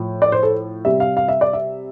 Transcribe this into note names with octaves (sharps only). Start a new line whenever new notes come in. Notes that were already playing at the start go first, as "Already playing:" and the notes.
Already playing: A2 F3
D5
C5
A4
C3 G3 E5
F5
F5
E5
D5
E5